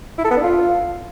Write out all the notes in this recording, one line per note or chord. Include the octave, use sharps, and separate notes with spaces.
E4
A4
B3
D4
F4